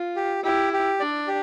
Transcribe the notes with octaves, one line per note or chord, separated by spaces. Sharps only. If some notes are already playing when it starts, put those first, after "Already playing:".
Already playing: F4
G4
E4 G4
G4
D4 D5
G4